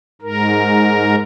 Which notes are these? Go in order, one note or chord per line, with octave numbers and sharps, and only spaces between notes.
G#2 A#4